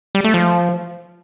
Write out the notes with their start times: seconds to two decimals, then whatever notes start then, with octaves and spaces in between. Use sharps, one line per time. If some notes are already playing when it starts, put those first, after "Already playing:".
0.15 G3
0.24 A3
0.34 F3